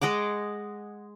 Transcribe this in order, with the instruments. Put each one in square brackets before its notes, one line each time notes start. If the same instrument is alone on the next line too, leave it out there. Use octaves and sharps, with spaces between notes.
[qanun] G#3 D#5 F#5 D6